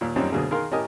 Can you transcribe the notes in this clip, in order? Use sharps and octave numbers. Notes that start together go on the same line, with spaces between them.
D#2 A#2
F#2 A#2 G3 C4 C#4 D#4
D2 B2 D3 F#3 A#3 G#4
D#3 G#4 A#4 F5 C6 F6
A2 C#4 G4 A#4 D#5 G#5